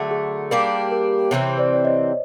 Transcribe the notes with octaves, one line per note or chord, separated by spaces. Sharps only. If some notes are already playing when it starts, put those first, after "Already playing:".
Already playing: D3 F#3 A3 G#4
G#4
G3 A#3 D4 G4 A#4
A#4
C3 E3 A3 C4 C#5
C5 D5
D5
C#5 D#5